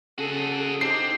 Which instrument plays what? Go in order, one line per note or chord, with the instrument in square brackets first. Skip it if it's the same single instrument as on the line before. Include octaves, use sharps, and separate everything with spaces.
[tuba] C#3 [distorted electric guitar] F#4 G#4 [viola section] A4
[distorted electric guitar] C4 [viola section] D4 D#4 G4 [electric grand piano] C7